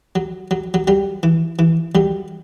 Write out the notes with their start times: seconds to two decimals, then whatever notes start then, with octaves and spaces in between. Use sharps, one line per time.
0.15 F#3
0.51 F#3
0.74 F#3
0.87 F#3 G3
1.23 E3
1.59 E3
1.95 F#3 G3